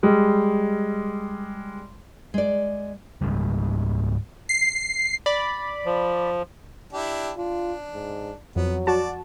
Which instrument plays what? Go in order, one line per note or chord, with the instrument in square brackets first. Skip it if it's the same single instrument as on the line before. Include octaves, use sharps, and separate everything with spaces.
[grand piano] G3 G#3
[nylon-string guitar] G#3 D5
[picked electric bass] C#2 G#2 C#3 G3
[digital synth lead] C7
[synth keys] D5 B5
[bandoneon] F3
[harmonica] D4 E4 G4
[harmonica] D4 [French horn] F4
[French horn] G#2
[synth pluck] F2 [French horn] F#3 [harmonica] B3
[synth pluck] F#4 A5 [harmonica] D5